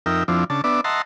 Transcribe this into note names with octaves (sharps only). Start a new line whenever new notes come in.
F2 D#4 A#4 E5 G5
F2 F3 C4 D4 E4
C#3 D4 A5
B3 D4 D5 E5
D#5 E5 F#5 A5 A#5 C6